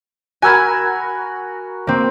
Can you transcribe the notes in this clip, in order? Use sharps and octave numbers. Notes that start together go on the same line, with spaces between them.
F#4 A#4 G#5 B5 E6 G#6
A#3 C4